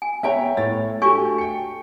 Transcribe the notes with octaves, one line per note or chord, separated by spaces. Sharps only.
G#5
B3 C#5 E5 G5 A#5
A2 C#5 A6
A3 D4 F#4 G4 G#5 C#6
G5 C#7